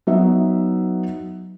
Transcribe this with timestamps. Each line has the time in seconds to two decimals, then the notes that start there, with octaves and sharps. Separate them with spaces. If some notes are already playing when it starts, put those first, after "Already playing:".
0.07 F#3 B3 D#4 E5